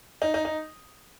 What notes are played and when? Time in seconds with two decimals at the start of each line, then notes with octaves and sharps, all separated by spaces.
0.22 D#4
0.34 D#4
0.45 D#4